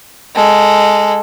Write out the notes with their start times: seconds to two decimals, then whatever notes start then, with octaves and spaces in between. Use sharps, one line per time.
0.35 G#3 A4